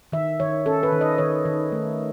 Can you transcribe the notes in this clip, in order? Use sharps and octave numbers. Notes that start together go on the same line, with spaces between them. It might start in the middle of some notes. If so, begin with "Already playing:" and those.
D#3 E5
D#3 C#5
C#4 A4
B4
D#3
D#5
D#3 C#5
D#3
A3